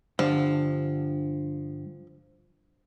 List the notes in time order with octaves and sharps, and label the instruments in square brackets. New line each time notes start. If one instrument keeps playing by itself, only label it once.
[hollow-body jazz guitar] G2 D3 [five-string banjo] F3